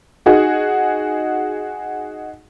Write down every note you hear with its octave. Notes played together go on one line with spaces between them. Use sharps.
D#4 F#4 G#4